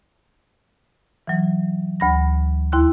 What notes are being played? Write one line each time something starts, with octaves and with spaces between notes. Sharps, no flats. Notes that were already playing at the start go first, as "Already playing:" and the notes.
E3 F#3
D2 B5 A#6
D#2 E4 C6 F#6